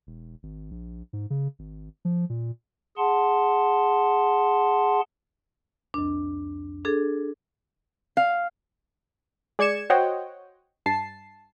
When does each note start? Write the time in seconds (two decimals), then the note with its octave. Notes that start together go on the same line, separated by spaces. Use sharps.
0.07 E1
0.43 G#1
0.71 A#1
1.13 G#2
1.30 C#3
1.59 G#1
2.05 F3
2.30 A#2
2.97 G#4 F#5 A5 C6
5.94 C2 F2 D4
6.85 D4 G#4 A4
8.17 F5
9.59 G#3 D5 G#6 C#7 E7
9.90 F#4 C5 C#5 D#5 F#5 G5
10.86 G2 A5 C7